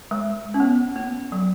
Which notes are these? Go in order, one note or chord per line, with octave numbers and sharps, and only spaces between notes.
G#3
C#4
B3
A#3
F#3